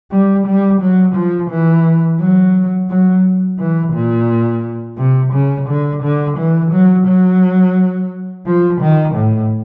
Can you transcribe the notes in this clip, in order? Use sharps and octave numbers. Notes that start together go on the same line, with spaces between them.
G3
G3
F#3
F3
E3
F#3
F#3
E3
A#2
C3
C#3
D3
D3
E3
F#3
F#3
F3
D#3
A2